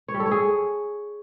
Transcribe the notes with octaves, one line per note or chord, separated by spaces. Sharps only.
C#5
G3
A4
C#5
G#4